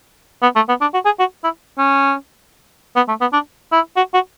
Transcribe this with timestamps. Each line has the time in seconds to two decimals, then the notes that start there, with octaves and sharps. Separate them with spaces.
0.43 B3
0.56 A3
0.69 B3
0.81 D4
0.94 F#4
1.05 G#4
1.19 F#4
1.44 E4
1.78 C#4
2.96 B3
3.08 A3
3.21 B3
3.33 D4
3.72 E4
3.97 F#4
4.14 F#4